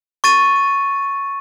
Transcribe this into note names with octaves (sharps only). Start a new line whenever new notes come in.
C#6 A6 D#7